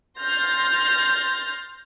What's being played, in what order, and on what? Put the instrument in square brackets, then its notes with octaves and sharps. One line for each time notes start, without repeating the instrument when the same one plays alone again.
[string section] C6 F6 G6 A6 A#6